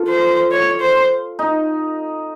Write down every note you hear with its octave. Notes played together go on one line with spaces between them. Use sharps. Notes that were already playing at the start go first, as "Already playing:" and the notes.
Already playing: F4 A4
C5
C#5
C5
D#4